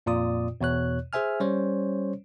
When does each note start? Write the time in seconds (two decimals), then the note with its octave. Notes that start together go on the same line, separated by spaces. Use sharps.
0.06 F2 A#2 F4 D5 D#6
0.61 E2 B2 C#5 F#6
1.13 G#4 C5 E5 G#5 F6
1.40 G3 C#4 C5 C#5